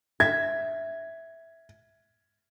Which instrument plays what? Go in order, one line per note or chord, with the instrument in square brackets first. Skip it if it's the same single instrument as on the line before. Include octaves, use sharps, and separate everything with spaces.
[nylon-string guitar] E5 [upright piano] G#6